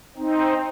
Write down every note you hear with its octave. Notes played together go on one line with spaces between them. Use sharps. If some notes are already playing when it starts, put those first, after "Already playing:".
C4 D#4